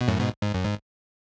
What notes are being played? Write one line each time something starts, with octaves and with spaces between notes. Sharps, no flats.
B2
F#2 A2
G#2 B2
G#2
F#2
G#2